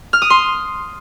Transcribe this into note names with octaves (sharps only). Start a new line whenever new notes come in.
F6
D#6
C6